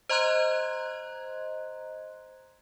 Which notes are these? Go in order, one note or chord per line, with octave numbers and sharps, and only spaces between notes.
C5 D#5 A#5 C6 F#6 G#6